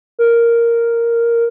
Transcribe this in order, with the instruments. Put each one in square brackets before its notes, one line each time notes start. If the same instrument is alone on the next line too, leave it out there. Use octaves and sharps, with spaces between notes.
[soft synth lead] A#4